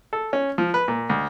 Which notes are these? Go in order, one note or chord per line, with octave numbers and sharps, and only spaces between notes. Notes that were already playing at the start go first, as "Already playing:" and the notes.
A4
C#4
F3
B4
A#2
D2